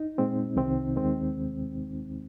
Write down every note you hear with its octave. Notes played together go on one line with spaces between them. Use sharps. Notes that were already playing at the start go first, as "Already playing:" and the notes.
Already playing: D#4
A#2 G#3 C4
C2 C3 D#3 C4
D#2 D#3 G#3 C4